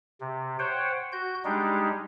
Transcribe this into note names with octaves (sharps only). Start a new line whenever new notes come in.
C3
C5 C#5 F#5 G5
F#4 G6
G3 G#3 D4 D#4 G4